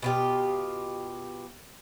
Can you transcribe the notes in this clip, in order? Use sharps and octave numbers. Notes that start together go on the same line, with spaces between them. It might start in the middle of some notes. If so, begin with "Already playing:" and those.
B2 F4 G4